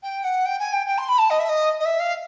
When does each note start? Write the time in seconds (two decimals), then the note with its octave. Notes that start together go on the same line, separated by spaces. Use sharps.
0.02 G5
0.23 F#5
0.45 G5
0.59 G#5
0.72 G5
0.86 G5
0.98 C6
1.08 B5
1.18 A5
1.30 D#5
1.39 E5
1.48 D#5
1.79 D#5
1.85 E5
1.99 F5